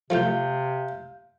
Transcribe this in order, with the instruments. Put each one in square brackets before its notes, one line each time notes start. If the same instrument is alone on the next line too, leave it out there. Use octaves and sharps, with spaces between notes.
[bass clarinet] C3 [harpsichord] F3 A3 F4 [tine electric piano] F5 G6